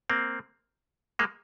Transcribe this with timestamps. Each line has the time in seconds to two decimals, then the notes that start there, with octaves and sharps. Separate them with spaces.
0.10 A#3 C4
1.19 G#3 A#3